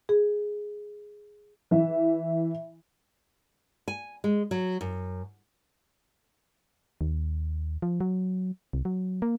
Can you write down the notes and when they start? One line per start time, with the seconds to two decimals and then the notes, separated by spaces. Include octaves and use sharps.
0.09 G#4
1.71 E3 E5
3.88 G#5
4.24 G#3
4.51 F#3
4.81 F#2
7.01 D#2
7.82 F3
8.01 F#3
8.73 C2
8.85 F#3
9.22 A#3